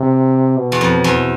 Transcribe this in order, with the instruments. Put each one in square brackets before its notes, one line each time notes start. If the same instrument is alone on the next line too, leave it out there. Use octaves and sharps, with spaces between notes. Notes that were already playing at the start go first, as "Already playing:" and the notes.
Already playing: [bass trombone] C3
B2
[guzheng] E2
F2
E2